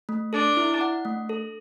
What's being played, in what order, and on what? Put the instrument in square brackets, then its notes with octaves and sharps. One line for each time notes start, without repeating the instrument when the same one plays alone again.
[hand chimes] A3
[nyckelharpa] D4 [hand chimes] A4
[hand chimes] E4
F#5
A3
A4